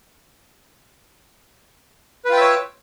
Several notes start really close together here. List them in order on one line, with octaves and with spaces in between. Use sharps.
B4 F4 G5 E5 C#5